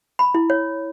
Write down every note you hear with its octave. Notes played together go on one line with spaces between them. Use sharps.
B5
E4
C#5